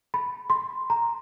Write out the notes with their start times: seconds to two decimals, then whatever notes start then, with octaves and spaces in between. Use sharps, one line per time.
0.14 B5
0.50 C6
0.90 A#5